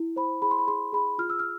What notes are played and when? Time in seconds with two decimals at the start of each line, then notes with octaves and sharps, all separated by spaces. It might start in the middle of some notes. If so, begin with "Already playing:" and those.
Already playing: E4
0.16 C5 B5
0.42 G#4 B5
0.51 C6
0.58 B5
0.67 G#4 C6
0.93 G#4 B5
1.18 F4 F6
1.30 E6
1.39 F6